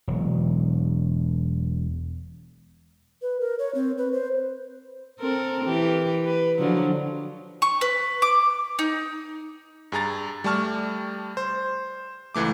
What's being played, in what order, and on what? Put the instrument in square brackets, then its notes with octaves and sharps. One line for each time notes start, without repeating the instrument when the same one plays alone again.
[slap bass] E1 F#3
[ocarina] B4
A#4
C#5
C4
B4
C5
[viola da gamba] C4 A4 A#4
E3 G4
B4
D3 F3 F#3
[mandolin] C#6
B4
D6
D#4
[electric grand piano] G2 G#4 A#5 A6
G3 A3 D5 A5 C#6 F6
C5
C#2 E3 A3 D6